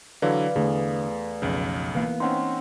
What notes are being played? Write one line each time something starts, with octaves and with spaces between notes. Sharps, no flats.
D3 E3 F#3 B4 D5 F5
E2 D3 A3 G#4
B1 F2 C#3
E3 A#3 B3 F5
C4 C#4 D#4 F#5 G5 C6